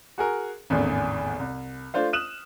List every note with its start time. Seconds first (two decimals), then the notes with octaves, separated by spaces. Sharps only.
0.18 F#4 G#4 A#4
0.70 G#1 E2 A2 C#3
1.39 C2
1.94 A3 D4 F4 C5 F5
2.13 D#6 F6 F#6 D#7 E7 F#7